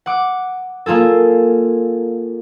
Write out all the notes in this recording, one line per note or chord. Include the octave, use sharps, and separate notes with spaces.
F#5 D6
A#3 F4 G#4 A4